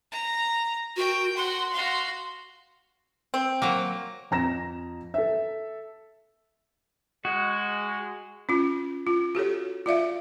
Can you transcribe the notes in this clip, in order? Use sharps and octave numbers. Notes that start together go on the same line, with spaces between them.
A#5
F#4 A#4 G5
F#4 F#5 C6
F#4 F5 C6
C4
F#3 A#3
F2 A#5 A#6 E7
A4 E5
G#3 F#4
C#4 F4
F4
F#4 G4 A4 C#5
F4 D5 E5 F5